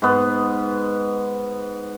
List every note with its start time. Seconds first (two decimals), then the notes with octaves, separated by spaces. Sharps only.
0.02 G#2 B3